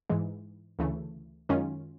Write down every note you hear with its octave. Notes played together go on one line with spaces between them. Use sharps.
G#2 E3 G#3
D2 C#3 E3 A3
F#2 D#3 G#3 C#4 F4